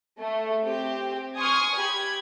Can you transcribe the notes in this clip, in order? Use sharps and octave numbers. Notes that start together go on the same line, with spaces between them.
A3
C4 G4
G#5 C6 C#6 D#6 F6 G#6
G4 B5 G#6